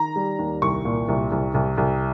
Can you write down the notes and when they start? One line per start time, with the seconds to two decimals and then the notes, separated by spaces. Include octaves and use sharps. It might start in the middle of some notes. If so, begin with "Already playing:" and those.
Already playing: D#3 A#5
0.16 G3
0.39 D#2
0.62 C2 C#6
0.85 A#2
1.08 C2
1.31 C2
1.54 C2
1.77 C2